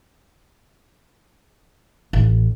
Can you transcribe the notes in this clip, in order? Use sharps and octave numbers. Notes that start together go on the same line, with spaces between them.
A1